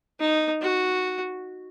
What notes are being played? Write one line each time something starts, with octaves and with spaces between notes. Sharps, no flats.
D#4
F#4